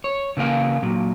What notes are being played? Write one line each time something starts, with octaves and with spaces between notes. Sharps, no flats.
C#5
C#3 E3 A#3 F5
A#2 F#3